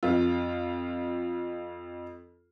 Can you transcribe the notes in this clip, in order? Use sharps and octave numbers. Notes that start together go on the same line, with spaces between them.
F2 F4